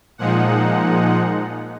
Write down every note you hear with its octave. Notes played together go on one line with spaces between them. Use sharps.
A#2 F3 G#3 D#4 F#5